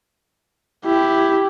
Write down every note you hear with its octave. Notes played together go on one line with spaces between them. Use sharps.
E4 G4